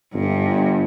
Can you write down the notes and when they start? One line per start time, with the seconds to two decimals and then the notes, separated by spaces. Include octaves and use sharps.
0.14 G1 G2